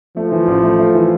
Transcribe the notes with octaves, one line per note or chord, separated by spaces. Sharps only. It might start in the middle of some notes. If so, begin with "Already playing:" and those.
F3 A3
E3
A1
A3
A3
E3